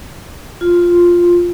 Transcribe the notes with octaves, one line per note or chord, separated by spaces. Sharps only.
F4